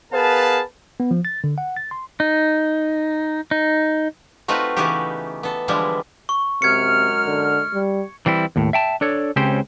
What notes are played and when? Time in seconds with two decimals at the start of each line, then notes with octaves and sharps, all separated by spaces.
0.13 B3 G#4 A#4 B4 F5 A5
1.00 B3
1.11 F3
1.25 A6
1.44 D3
1.58 F#5
1.76 A6
1.91 C6
2.20 D#4
3.51 D#4
4.48 A3 C4 D#4 F4 F#4 B4
4.76 C#3 E3 B3 D#4 F#4 G4
5.43 B3 A4
5.68 D3 E3 F3 G3 G#3 E4
6.29 C#6
6.62 F#2 C3 G#3 F6 G#6 C#7
7.26 D3
7.74 G3
8.26 E3 G3 C4 E4
8.56 D#2 A2
8.73 E5 G5 A5
9.01 D4 A4 C#5
9.36 C#2 C#3 C4 C#4 G4 C5